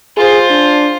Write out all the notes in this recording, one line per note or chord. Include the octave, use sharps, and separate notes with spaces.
F4 G#4 C5
D4